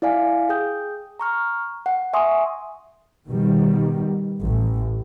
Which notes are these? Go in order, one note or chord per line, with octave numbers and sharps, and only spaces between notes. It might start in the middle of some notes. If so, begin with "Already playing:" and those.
E4 D5 F5 G#5
G#4 G5 D#6 G6
A#5 C#6 F6
F#5
E5 G#5 C6 C#6 D#6
B2 D#3 G3
A1